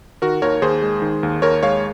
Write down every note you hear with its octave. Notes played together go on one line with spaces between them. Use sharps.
D#3 F#4 A#4
D#2 A#4 C#5
D#2 G#4 C5
G#3
D#3
D#2
D#2 A#4 C#5
G#3 C#5 F5